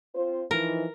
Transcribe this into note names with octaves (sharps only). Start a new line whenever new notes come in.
C4 F4 C5
E3 F3 D#4 A#4